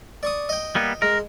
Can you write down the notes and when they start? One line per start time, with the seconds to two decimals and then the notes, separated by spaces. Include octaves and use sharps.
0.23 D5 C#6 D#6
0.49 D#5 G5
0.75 G3 A#3 B3
1.02 G#3 A#4